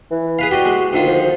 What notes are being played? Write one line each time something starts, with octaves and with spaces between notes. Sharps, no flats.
E3
G#4 B4 F5
F#4 G4 D5 D#5
G#3
D2 D#3 F4
F3